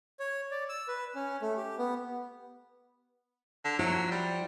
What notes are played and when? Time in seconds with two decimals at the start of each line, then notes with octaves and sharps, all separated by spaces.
0.19 C#5
0.51 D5
0.69 E6
0.88 B4
1.15 C#4
1.42 A3
1.57 G4
1.78 B3
3.65 D3
3.79 F3 F#3 E4 F#4
4.11 G3